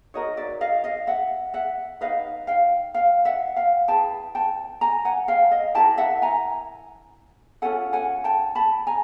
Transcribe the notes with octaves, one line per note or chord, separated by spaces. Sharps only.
D#4 F#4 A#4 C#5 D#5
D5 E5
D#5 F5
D#5 F5
E5 F#5
E5 F#5
D#4 G4 B4 D#5 F5
F5 G5
F5 G5
E5 F#5
F5 G5
E4 G#4 B4 G5 A5
G5 A5
G#5 A#5
F#5 G#5
F5 G5
D#5 F5
E4 G4 A#4 G5 A5
E5 F#5
G#5 A#5
C#4 F4 A4 F#5 G#5
F#5 G#5
G5 A5
A5 B5
G#5 A#5